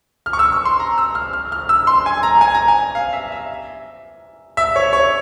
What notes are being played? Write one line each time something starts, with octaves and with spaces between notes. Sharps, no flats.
F6
C#6
E6
C#6
C6
A#5
E6
F6
F6
F6
E6
C6
G#5
A#5
G#5
A#5
G#5
F5
E5
E5
E5
C#5
C#5